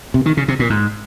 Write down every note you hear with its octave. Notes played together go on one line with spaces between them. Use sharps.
C3
D#3
C#3
C3
A#2
G#2